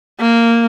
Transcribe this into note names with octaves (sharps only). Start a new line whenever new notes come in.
A#3